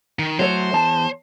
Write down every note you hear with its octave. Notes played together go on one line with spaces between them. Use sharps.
D#3
F#3 A3 C5 C#5
E2 A5